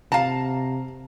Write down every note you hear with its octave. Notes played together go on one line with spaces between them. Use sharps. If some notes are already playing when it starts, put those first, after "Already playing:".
C3 F5 A5 A#5